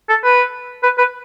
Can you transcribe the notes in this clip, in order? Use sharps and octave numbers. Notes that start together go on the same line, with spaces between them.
A4
B4
B4
B4